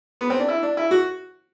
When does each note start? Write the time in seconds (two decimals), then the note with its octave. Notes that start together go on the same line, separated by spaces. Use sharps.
0.21 B3
0.30 C4
0.40 D4
0.48 E4
0.63 D4
0.77 E4
0.91 F#4